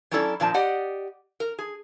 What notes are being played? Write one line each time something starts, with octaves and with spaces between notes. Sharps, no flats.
F#3 C#4 D4 E4 A4 D5
A#2 F3 C4 D4 A5
G4 D5 D#5 F#5
A#4
G#4